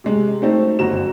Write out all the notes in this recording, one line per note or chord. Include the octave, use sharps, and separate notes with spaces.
C3 G#3
F#3 A3 C4 D#4 C5
G1 F#2 F#4 E7